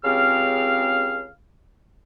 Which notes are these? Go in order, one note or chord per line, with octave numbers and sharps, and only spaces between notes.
C#2 C#3 C4 G4 F5 F6